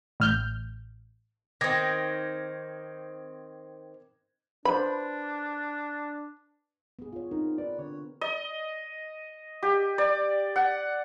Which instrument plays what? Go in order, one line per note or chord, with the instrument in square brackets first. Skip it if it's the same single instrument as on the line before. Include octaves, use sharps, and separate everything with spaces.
[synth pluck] A1 F6 G6
[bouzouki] D#3 C4 [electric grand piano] D6 G#6 A#6
[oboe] D4 [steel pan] B4 C5 [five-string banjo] B5
[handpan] B3 G#4
F4 C#5
[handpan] C4 A#4 [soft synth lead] D#4
[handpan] B4 [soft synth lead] D5
[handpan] D3 [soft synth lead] C#5
[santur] D#5
G4
D5
F#5